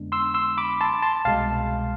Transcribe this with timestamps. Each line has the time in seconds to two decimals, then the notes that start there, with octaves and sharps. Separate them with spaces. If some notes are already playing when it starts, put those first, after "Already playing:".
Already playing: F2 D3 G#3 B3 D4
0.12 C6 E6
0.34 C6 E6
0.57 B5 D6
0.81 A5 C6
1.02 A5 C6
1.25 C2 B2 G#3 F5 A5